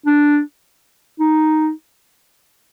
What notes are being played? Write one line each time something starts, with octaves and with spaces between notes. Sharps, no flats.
D4
D#4